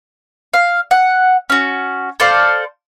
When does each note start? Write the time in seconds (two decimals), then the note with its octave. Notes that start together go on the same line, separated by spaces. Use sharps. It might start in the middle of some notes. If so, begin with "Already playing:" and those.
0.54 F5
0.91 F#5
1.50 C#4 F#4
2.20 A4 C5 D5 F5